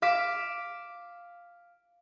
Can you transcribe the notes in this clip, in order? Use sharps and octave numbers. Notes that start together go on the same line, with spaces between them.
F5 D6 B6 E7